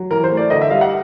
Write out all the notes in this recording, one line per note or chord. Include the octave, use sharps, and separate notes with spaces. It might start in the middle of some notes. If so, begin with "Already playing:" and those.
Already playing: F#3
E3 A#4
C5
A3
D5
D3 D#5
E5
G3 F5
F#5